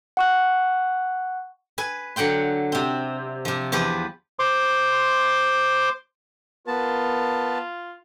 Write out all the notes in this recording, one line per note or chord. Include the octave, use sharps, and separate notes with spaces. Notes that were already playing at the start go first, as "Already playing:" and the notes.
F#5 C#6 F#6
B4 G#5
D3 F#3 F#5 G5 C6
C3 C4
C3 F3
E2 F3 G4 B4
C5 C6 D6
B3 F4 A#4 A5